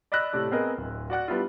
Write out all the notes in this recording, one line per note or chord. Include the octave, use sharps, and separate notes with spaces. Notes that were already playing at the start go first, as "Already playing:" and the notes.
D5 D#5 B5 E6 F#6 A#6
A2 C3 A3 D5
B3 C4 G#4 A#4 D#5
D1
F#4 D5 F#5 F#6
G3 B3 D4 E4 F4